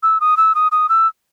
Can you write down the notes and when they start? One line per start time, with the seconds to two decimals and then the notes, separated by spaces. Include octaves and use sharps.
0.03 E6
0.20 D#6
0.37 E6
0.55 D#6
0.72 D#6
0.89 E6